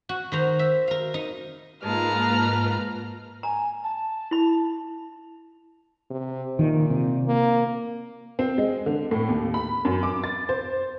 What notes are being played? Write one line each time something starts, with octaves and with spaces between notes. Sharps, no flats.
F#4
D#3 C5 A#5
E5
A#4 F5
D#4
G#2 G#3 A#3 F4 B4 A5 A#5 F6
G#5 A#5
A5
E4 B5
C3
A#2 D#3
C3
A#3
C4
G#3
D3
A2
D#2
B5
F#2
D6
A6
C5